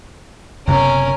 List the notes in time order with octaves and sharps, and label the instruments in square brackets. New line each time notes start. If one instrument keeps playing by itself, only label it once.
[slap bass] F#1 C3 B3 [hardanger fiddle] C#4 A#4